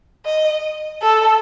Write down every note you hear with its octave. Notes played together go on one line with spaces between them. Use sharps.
D#5
A4